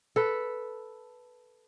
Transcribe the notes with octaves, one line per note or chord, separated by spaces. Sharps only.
A4 B4